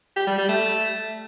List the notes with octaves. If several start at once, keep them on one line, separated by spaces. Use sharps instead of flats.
G4
G3
G3
A3